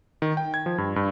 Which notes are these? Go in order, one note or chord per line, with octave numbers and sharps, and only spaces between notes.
D#3
G5
G#6
F3
G2
G2